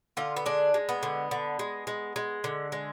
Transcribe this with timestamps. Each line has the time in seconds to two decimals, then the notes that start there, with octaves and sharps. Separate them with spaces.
0.17 D3 F4
0.36 B3
0.46 G#3 D4
0.74 G#3
0.89 B3
1.03 D3
1.31 D3
1.59 G#3
1.87 G#3
2.16 G#3
2.44 D3
2.72 G#3